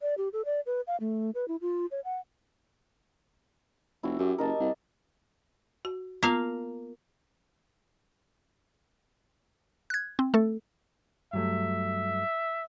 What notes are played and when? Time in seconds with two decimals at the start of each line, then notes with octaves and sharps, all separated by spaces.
0.02 D5
0.18 G4
0.33 A4
0.45 D5
0.66 B4
0.87 F5
1.00 A3
1.35 B4
1.48 E4
1.61 F4
1.91 C#5
2.05 F#5
4.03 F1 E4 F#4
4.19 F#2 G4
4.38 F#1 A#4 D#5 A5
4.60 C2
5.85 F#4
6.23 A#3 B3 F4 F5
9.90 F#6 G#6
10.19 C4
10.34 A3 A4
11.33 G2 F#3 A3 E5